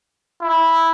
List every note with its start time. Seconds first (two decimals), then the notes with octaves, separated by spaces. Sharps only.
0.42 E4